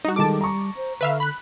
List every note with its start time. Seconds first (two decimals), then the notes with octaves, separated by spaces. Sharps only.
0.05 G3 D#4 F#4
0.16 D#3 G#3 A4 A5 D6
0.41 A#5 C#6
0.76 C5
1.01 D3 B4 E5 F5
1.20 B5 F#6